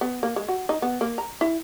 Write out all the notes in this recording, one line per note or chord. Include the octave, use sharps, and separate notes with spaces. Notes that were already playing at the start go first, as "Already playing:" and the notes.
B3
A#3
G#3
F#4
D#4
B3
A#3
A#5
E4